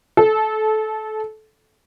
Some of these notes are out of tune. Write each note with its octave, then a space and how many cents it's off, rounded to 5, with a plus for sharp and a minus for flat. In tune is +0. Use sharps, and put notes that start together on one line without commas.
A4 -20